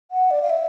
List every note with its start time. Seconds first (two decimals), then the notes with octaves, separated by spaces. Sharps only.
0.11 F#5
0.31 D5
0.42 F5
0.50 E5